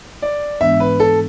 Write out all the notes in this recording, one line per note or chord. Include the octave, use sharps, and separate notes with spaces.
D5
G#2 E3 G#3 B3 D4 E5
B4
A4